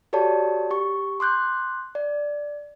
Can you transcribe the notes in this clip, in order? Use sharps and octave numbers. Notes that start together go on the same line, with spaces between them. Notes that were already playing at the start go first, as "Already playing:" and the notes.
F#4 G4 A4 C#5 D5 A5
G4 C#6
C6 D6 F#6 G6
D5